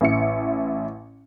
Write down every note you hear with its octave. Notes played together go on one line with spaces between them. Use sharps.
A1 E4 C#7